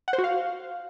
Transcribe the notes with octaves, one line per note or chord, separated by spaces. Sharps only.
F#5
C5
F#4
F5